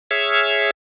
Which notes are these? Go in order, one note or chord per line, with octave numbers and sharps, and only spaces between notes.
G#4 C#5 E5 E6 F6